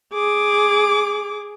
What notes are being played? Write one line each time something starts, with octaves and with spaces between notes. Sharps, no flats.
G#4 D6